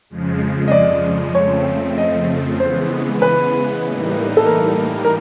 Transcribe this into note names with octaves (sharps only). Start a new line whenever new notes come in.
F2 C#3 F3 G#3
D#5
D5
F2 C#3 F3 A3 C4 C#5
D#5
C#3 E3 G#3 B3 C5
B4
A2 E3 G3 A#3 D#4
A4
A#4
A#4